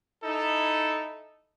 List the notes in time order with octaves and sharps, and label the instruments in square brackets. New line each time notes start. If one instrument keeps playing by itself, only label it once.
[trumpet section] D#4 E4 A4